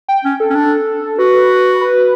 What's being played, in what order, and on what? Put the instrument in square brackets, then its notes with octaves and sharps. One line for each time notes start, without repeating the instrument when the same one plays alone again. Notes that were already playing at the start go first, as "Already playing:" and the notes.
[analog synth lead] G5
[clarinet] C#4
[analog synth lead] A4
[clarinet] C#4
D4
[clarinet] F#4 [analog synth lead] B4
[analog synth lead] B4